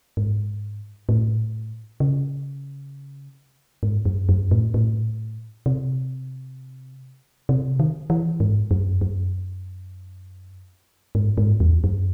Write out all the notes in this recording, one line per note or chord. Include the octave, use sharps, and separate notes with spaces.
G#2
A2
C#3
G#2
F#2
F#2
A2
A2
C3
C3
D#3
E3
G#2
F#2
F#2
G#2
G#2
E2
F#2